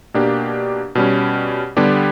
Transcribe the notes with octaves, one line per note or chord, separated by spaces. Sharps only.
B2 A#3 D4 G4
B2 G3 C#4
D3 G3 B3 D4 G4